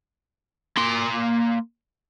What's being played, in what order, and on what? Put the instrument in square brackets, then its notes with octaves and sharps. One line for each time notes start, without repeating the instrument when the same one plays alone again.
[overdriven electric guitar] A#3 C6